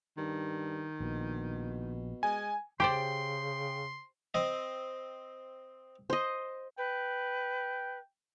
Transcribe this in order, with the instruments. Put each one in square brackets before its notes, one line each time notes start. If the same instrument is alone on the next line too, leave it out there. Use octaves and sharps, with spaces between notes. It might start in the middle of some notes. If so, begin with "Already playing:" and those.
[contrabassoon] G2 [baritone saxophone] D#3
[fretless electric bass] A#1 [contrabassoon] B2
[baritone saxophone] G#3 [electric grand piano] G#5
[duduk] C#3 [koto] G4 C5 D5 [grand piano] G5 [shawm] C6
[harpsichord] C4 D#5
[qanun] C5 D#5
[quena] B4 [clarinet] G5